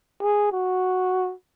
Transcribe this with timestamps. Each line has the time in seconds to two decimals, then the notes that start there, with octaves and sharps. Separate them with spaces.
0.21 G#4
0.52 F#4